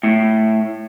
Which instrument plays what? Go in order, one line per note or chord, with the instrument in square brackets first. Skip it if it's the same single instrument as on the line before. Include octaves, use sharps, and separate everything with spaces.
[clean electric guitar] A2